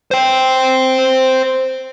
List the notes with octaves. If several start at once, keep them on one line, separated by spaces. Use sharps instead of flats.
C5 G5